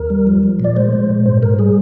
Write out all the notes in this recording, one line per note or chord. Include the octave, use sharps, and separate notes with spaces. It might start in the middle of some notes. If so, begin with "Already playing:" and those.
Already playing: D#2 A#4
G3
F3
F3
A#2 D5
G#3 C5
G#3
A#2
G#2 C5
G#2 A#4
G3 G#4